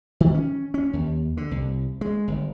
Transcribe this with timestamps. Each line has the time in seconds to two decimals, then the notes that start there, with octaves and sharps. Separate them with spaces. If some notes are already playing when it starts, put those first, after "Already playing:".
0.20 D#3
0.34 C#4
0.74 C#4
0.93 D#2
1.37 D3
1.51 C2
2.01 G#3
2.28 G1